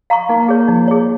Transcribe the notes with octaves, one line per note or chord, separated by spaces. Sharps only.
F5 A#5 C#6
A#3 D#4
A#3
G#4 C#5
F3 D#4
G#4 C#5